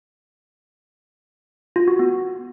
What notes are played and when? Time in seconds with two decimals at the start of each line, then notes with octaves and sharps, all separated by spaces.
1.76 F4
1.88 F#4
1.99 B3